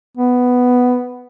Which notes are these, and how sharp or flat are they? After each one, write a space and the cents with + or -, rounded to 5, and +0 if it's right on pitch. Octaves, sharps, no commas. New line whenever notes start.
B3 +5